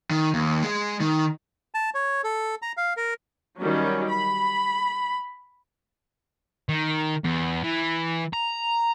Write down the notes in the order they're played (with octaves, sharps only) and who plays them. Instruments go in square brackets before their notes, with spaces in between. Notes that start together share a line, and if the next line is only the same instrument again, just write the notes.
[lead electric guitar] D#3
D#2
G#3
D#3
[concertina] A5
C#5
A4
A#5
F5
A#4
[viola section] D#3 F#3 G3 C#4
B5
[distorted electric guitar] D#3
E2
E3
A#5